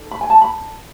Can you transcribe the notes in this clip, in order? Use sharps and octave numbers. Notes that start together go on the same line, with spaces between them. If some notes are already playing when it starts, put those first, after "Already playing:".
Already playing: D#4 A4
B5
G#5
A5
B5